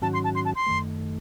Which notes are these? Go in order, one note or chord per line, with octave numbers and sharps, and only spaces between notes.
G#2 D#3 F#3 C#4 F#4 A5
C6
A5
C6
A5
C6
F#2 D#3 A3